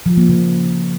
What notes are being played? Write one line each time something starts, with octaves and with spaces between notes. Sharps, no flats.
F3
A#3
C#3